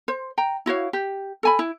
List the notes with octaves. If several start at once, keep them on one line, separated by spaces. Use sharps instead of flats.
C5
G5 A#5
E4 F#4 C#5 F5
G4
A4 G#5 B5
E4